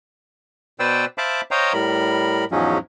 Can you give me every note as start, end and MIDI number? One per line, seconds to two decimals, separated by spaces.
0.80 1.05 47
0.80 1.05 71
0.80 1.05 72
0.80 1.05 74
0.80 1.05 79
0.80 1.05 88
1.18 1.41 72
1.18 1.41 76
1.18 1.41 77
1.18 1.41 81
1.18 1.41 83
1.18 1.41 86
1.51 1.73 72
1.51 1.73 73
1.51 1.73 75
1.51 1.73 77
1.51 1.73 79
1.51 1.73 82
1.74 2.45 45
1.74 2.45 55
1.74 2.45 70
1.74 2.45 83
2.51 2.78 40
2.51 2.78 44
2.51 2.78 53
2.51 2.78 54
2.51 2.78 56
2.51 2.78 61